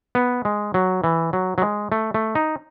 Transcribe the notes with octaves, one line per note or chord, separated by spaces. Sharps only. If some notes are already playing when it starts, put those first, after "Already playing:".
B3
G#3
F#3
E3
F#3
F#3
G#3
A3
A3
D#4